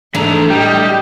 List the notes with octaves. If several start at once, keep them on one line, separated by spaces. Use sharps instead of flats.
G#2 E3 A3 D4 A4 A#5
A2 G3 G4 D#5